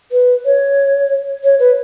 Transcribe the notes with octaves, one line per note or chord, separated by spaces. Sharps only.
B4
C#5
C#5
B4